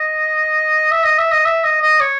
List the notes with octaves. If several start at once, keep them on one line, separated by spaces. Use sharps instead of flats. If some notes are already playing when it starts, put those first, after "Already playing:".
Already playing: D#5
E5
D#5
E5
D#5
E5
D#5
D#5
C#5